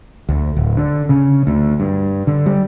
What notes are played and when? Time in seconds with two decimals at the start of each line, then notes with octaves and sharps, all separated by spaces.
0.29 D2
0.57 D1
0.77 D3
1.09 C#3
1.47 D2
1.80 G2
2.27 D3
2.46 G3